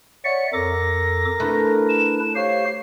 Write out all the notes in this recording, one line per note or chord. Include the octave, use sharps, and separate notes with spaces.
C#5 D5 E5 F#5 C#7
F2 A4 A#4 D6 A#6
A3 D4 E4 B4
E7
G4 C5 C#5 F5 C7